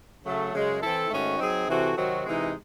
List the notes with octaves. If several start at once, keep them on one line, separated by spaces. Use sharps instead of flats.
C#3 F#3 A3
F#2 C#3 G#3
E3 C4 E4 A4
G#2 D#3 A3 C#4 F#4
F#3 C4 D#4 G#4
C3 E3 C4 F#4 A4
C3 D#3 F#3 C4 F#4
C3 E3 G#3 D#4